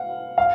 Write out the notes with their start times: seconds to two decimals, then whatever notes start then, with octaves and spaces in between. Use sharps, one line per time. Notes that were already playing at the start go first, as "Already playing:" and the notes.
Already playing: F5 F#5
0.38 F5